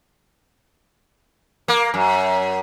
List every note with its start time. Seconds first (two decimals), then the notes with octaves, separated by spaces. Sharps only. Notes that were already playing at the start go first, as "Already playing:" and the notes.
1.68 A#3
1.94 F#2